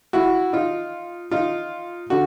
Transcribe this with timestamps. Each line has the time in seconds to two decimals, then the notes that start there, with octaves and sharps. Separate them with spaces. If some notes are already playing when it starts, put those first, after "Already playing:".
0.13 E4 F#4
0.53 D#4 F4
1.31 D#4 F4
2.10 D3 F#4